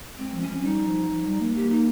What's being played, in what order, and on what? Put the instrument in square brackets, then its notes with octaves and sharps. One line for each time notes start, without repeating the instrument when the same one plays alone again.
[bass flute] G#3 [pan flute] C4
[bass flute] F3
[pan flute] C#4
[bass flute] F3
F3
[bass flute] G3 [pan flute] D#4
[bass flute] F3
F3
G3
A#3
[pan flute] G4
D#4